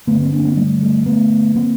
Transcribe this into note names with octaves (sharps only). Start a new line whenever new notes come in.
G2 D3 A3 B3
A#3 C4
C4 D4
A#3 C4
G3 A3
G3 A3
A3 B3
A#3 C4